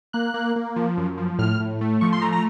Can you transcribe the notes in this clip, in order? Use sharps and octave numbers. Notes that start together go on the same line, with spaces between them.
A#3 F#6
A#3
A#3
F3
F#2
F3
A2 F6
A2
A3
F3 C#6
C6
A3 A#5
A#5